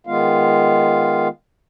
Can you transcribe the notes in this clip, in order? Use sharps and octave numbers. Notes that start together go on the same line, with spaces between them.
D#3 G#3 B3 F4 F5